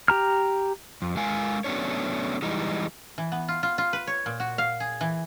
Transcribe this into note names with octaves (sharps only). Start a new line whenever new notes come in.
G4 A#5 F6
F2
G#3 A#4 F5 G#5
F#3 A3 B3 C#4 D4 C#5
E3 G3 G#3 D#4
E3
B3
F4
F4
F4
B4
C#5
A#2
F#4
F5
G#4
E3